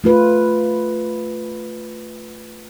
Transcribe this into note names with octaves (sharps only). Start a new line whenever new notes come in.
A3 F4 B4